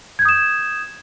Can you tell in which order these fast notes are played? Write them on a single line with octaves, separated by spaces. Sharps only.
G#6 G6 D#6 E7